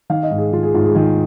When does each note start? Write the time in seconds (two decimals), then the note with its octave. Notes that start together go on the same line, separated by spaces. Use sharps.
0.10 D#3 F5
0.23 D#5
0.31 G#2
0.38 G#4
0.52 D#3 F4
0.63 G#4
0.74 G#2 F4
0.84 G#4
0.95 D#3 G#4